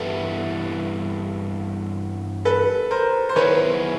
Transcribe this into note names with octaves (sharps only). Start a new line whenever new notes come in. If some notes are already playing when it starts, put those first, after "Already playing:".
Already playing: G2 E3 G3 B3 E4 A4 B4
A4 B4
A#4 C5
C5
D#3 F#3 B3 E4 G#4 B4 C#5